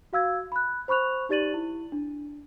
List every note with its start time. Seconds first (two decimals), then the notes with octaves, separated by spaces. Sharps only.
0.13 F#4 F5 E6 G#6
0.52 B5 F#6
0.88 C5 B5 C#6 F#6 F7
1.29 D#4 G4 D5 A6 D#7 F#7
1.54 E4
1.92 D4